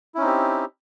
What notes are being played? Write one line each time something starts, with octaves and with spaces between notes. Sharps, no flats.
C4 C#4 D#4 E4 G4